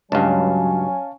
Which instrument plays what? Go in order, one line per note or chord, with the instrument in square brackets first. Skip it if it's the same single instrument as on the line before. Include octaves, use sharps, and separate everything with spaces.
[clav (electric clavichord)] C#2 G2 [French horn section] F#3 [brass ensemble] C#4 C#5 G#5 [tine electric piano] F5 A5